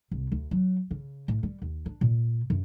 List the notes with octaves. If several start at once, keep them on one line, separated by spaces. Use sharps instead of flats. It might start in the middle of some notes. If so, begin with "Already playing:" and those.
C2
D2
F#3
C#3
A2
G3
D#2
D4
A#2
F#2